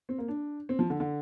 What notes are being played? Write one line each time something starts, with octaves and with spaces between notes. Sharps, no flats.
C4
A#3
D4
C4
F3
D3
D3